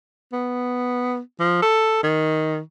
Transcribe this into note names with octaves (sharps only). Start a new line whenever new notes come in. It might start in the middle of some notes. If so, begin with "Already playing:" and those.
B3
F3
A4
D#3